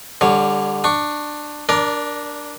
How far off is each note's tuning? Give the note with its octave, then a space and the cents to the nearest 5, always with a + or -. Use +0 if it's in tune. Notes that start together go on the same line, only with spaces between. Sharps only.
D3 +0 G3 +25 C#5 +0
D4 +15 C#6 +0
D4 +0 A#4 +15 D5 -30